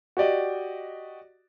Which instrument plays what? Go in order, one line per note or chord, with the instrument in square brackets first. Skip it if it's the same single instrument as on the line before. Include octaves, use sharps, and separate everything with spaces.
[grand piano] F#4 G4 D5 D#5